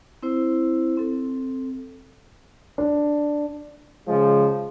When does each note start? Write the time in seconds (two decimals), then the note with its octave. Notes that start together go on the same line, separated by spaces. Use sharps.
0.22 C4 E4 C5
0.97 C4 A4
2.78 D4
4.07 C#3 F3 G#3